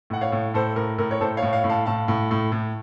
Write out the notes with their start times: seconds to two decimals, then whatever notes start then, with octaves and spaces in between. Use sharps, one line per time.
0.10 A2 F#5
0.21 C#5 F5
0.32 A2
0.54 A2 A4 C5
0.76 A2 A#4
0.98 A2 A#4
1.11 C#5
1.21 A2 A4 C5
1.37 C#5 F5
1.42 A2
1.53 C#5 F5
1.64 A2
1.69 F5 A5
1.86 A2 F5 A5
2.08 A2
2.31 A2
2.52 A2